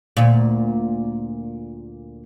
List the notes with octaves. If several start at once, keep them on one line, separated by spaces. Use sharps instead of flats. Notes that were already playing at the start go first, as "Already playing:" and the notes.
D2 A#2